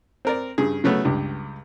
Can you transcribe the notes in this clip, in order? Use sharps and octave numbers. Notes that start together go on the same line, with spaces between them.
C4 A#4 D5
G2 C#3 G#4
C#3 F#3 A3 B3
C#2 G2 G4